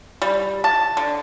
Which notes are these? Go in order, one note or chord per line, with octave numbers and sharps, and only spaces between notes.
G3
A5
D3